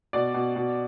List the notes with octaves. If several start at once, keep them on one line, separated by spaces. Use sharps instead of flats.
B2 D5
B2
B2